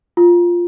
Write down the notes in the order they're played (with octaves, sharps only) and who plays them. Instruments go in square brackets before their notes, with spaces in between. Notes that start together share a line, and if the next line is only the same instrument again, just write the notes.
[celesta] F4